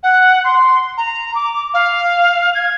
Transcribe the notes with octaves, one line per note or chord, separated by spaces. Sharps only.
F#5
C6
A#5
D6
F5
G#6